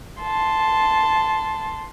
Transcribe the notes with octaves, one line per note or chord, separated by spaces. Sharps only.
A5 C6